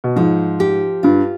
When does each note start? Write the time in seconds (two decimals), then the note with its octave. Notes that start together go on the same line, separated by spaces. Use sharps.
0.04 B2
0.16 G#2 F3
0.60 G4
1.03 G2 F4